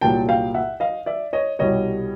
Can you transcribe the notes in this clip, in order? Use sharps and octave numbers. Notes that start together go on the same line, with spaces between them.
C2 A#2 F#3 G5 A5
F5 G5
E5 F#5
D#5 F5
D5 E5
C#5 D#5
C2 B2 G3 C#5 D#5